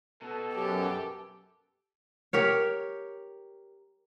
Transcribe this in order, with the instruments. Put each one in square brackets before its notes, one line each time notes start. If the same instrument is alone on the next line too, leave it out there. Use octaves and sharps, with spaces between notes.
[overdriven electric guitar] B2 [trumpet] A4
[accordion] F#2 [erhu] G4
[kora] G4 A#4 C#5